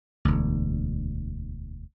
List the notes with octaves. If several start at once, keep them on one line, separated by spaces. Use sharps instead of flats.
E1 D2